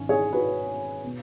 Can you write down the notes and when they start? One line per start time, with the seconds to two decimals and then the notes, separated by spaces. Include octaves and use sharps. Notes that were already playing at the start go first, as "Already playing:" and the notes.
Already playing: G#1 D#3 C#4
0.09 G#4 C#5
0.33 F#4 B4
1.04 B2